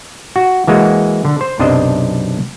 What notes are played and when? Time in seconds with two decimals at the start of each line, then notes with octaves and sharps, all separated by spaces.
0.36 F#4
0.67 E3 G#3 A#3 F#4
1.25 D3
1.41 C5
1.59 B1 F#2 C3 D4 C5 D#5